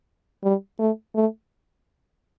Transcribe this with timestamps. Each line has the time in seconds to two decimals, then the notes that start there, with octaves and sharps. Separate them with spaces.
0.44 G3
0.79 A3
1.15 A3